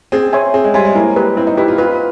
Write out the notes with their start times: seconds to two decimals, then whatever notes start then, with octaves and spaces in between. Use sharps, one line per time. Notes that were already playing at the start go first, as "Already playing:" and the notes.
0.12 C4 G#4
0.33 C#5 E5 G#5 C6
0.54 C4 G#4
0.64 G#3
0.74 G3 C#5 E5 G#5 C6
0.85 G#3
0.95 A#3 E4
1.16 G4 B4
1.37 C4 E4
1.47 D#4
1.57 E4 G4 B4
1.68 F4
1.78 F4 B4